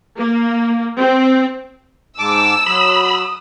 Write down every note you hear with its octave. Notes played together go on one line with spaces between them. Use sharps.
A#3
C4
G#2 A5 D6 E6
F#3 B5 D#6